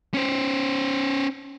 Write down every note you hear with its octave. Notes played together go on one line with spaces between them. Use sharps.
C#4 C5